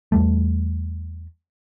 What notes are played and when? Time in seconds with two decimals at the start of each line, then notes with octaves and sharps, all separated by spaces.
0.12 E2 G3 A3